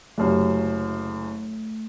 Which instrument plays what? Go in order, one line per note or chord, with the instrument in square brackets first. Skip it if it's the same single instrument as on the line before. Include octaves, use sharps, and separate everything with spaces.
[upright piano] F#1 F#2 C3 [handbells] A3